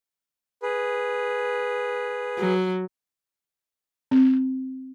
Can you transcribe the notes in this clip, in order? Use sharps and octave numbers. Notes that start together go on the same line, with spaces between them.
G#4 B4
F#3
C4